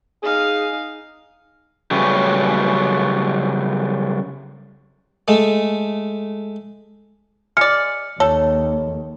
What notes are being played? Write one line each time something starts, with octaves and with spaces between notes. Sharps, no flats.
D#4 G#4 F5
C#3 F#3 G3 A3 C#4 B4
G#3 A3
G#3 D5 F6 C#7
D#2 A4 C#5